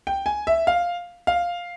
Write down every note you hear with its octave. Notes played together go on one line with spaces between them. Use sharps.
G5
G#5
E5
F5
F5